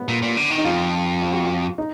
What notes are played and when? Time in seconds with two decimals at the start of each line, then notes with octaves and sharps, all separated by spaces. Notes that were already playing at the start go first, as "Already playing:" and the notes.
Already playing: B3
0.08 A#2
0.22 A#2
0.37 D3
0.50 D#3
0.58 D#4
0.65 F2 F4
1.21 F4
1.32 F#4
1.43 F4
1.78 D#4